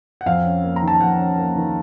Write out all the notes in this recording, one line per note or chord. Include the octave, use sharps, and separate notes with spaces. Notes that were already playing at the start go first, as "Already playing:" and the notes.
F#5
F2 F5
C#4
A#3
A#5
D#3
A5
F2 F#5
C#4
A#3
D#3